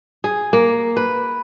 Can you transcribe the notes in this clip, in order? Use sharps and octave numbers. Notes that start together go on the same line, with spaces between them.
G#4
A#3
B4